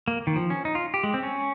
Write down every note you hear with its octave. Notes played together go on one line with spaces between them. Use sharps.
A#3
D#3
F3
C#4
D#4
F4
G4
G#3
C4
C#4